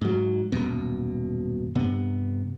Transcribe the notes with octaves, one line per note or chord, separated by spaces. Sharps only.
G#2 F#3
D#1 G#1 F#2 B2
G2 C3 B3